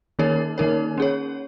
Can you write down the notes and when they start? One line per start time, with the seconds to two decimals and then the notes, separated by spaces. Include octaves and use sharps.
0.19 D#3 A#3 D#4 A#4 C#5
0.58 D#3 A#3 D#4 A#4 C#5
0.98 C#4 G#4 C#5